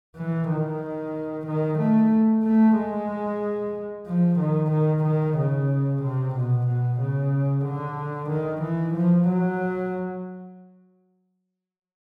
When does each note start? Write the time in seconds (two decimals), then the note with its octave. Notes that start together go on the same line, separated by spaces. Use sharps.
0.16 E3
0.48 D#3
1.47 D#3
1.79 A3
2.44 A3
2.77 G#3
4.07 F3
4.39 D#3
4.72 D#3
5.04 D#3
5.38 C#3
6.02 C3
6.35 B2
6.67 B2
7.00 C#3
7.65 D3
8.30 D#3
8.62 E3
8.95 F3
9.28 F#3